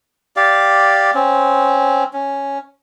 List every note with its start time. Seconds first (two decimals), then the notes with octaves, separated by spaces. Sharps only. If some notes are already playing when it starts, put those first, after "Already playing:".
0.36 G4 D5 F5
1.14 C4 C#4
2.13 C#4